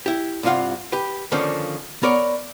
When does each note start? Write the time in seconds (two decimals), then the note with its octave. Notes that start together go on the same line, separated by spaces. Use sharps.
0.06 E4 G4
0.43 C2 G2 C3 F4 F5 F#5
0.92 G4 B4
1.32 D3 D#3 F3 A#3 C#4
2.03 B3 A#4 C#5 D5